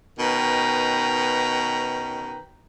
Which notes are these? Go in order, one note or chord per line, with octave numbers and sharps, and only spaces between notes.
B2 D#3 C#4 B4 G5 A#5